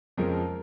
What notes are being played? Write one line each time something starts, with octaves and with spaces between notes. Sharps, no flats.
F2 C#3 F3 G#3 A#4